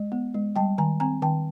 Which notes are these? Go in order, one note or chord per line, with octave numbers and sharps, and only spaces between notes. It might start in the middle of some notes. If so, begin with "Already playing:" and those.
Already playing: G#3
B3
G#3
G3 G5 A5
D#3 G#5 A#5
C4 G#5 A#5
D#3 G5 A5